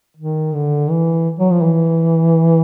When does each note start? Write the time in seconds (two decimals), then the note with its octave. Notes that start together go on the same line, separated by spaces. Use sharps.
0.17 D#3
0.54 D3
0.90 E3
1.39 F#3
1.51 F3
1.63 E3